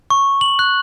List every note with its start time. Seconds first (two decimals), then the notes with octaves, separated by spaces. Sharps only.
0.10 C#6
0.41 F#7
0.59 F#6